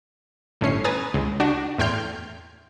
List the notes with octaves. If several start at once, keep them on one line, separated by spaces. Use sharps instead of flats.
G1 A2 C#4 C7
B4 G#5 A#5 D#6 A6
C#2
D4 F#4
E2 A2 G5 C6 F6 G6